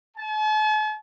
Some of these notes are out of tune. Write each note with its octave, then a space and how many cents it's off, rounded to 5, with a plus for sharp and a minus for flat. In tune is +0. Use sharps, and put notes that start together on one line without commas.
A5 -45